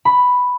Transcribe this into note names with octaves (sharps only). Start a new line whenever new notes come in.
B5